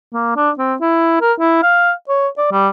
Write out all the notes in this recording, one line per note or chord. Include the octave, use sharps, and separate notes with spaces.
A#3
D4
C4
E4
A#4
E4
F5
C#5
D5
G3